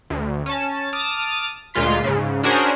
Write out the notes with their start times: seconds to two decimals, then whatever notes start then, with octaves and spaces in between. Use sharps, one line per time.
0.10 D2
0.46 C#4 A5
0.93 A5 D6 D#6 F6 A6
1.74 D2 A#2 G#3 F4 C6 B6
2.04 G#2 C#3
2.43 C#4 D4 F#4 G#4 A#4 C5